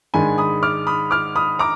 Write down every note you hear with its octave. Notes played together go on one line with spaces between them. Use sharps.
G#2 D#3 G#3 D4 G#5 B5
B5 D#6
D6 F6
B5 D#6
D6 F6
B5 D#6
A#5 D6